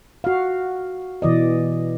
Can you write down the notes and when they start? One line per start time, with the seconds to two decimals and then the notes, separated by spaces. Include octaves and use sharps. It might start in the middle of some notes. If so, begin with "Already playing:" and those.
0.24 F#4 F5
1.22 B2 E3 D5 D#5